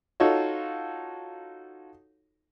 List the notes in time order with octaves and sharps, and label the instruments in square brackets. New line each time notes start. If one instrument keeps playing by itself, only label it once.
[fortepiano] D#4 F4 F#4 A4 C#5